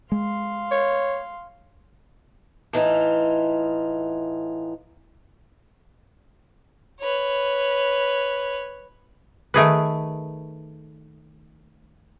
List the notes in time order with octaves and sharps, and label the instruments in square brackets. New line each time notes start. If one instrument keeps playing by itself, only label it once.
[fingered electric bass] G#3 [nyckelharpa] F5 C6
[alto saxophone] C#5
[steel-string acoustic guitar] A2 E3 D#4 F4
[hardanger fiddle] B4 C#5
[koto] D#3 A3 G#4 B4